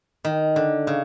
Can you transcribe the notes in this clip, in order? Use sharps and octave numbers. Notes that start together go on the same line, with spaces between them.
D#3
D3
C#3